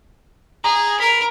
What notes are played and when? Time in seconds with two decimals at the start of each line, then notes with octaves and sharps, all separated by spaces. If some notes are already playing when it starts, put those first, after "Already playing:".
0.64 G#4 A#5
1.00 A#4 B5